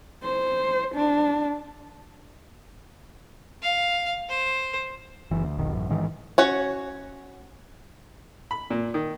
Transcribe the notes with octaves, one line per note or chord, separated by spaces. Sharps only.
C5
D4
F5
C5
F#1 E3
D2
F1 C2 B2 D#3
A1 F#2
A1 G#2 D#3 E3
C#4 F#4 C#5
B5
A#2
D#3